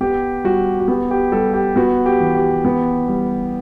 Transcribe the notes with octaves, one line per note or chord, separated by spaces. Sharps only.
B3 G4
G3 F#4
F#4
B3 G4
G4
G3 A4
G4
B3 F#4
G4
E3
G4
B3
G3